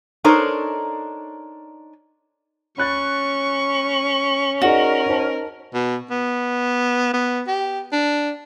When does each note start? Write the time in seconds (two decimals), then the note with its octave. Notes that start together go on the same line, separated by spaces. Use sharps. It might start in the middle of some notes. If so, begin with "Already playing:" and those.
0.24 D4 D#4 A4 A#4 C5 C#5
2.78 C#4 B5 C#6 F#6 A6
4.62 D#4 F#4 G#4 A#4 D5
5.06 D#4 C5 A5
5.74 B2
6.10 B3
7.13 B3
7.47 G4
7.92 D4